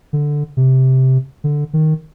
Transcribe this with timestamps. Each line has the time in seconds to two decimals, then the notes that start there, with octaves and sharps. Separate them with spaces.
0.13 D3
0.57 C3
1.44 D3
1.73 D#3